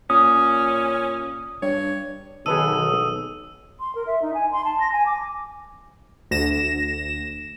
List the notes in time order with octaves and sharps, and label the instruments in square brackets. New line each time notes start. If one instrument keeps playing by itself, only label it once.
[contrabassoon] A#2 [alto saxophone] C#4 [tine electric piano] D#6
[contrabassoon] G2 [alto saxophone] C#5
[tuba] B1 [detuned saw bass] D#3 [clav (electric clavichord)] G#4 B4 A5 [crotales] D#6 E6 D#7
[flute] C6
A#4
E5
D#4
G#5
C6
A5
A#6
G#5
D6
[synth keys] D2 A#6 E7